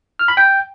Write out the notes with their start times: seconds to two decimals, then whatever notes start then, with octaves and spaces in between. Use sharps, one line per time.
0.19 F6
0.28 B5
0.37 G5